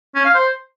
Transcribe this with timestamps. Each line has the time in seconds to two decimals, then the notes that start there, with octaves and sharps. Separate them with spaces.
0.15 C#4
0.25 F5
0.35 C5